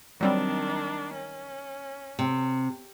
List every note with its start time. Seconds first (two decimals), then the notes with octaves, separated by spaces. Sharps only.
0.21 D#3 F#3 G3 C4 D4
1.14 C#4
2.19 C3